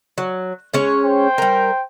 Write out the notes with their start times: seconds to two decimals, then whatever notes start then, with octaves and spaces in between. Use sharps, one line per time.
0.18 F#3
0.74 G#3 C#4 C#5
1.04 C5 G5
1.38 G3 A#4